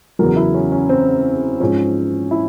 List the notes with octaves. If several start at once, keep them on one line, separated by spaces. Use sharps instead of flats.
E2 C#3 F#3 A#4
E4
C#4
C#4
C4
G#2 F3 C#4
E4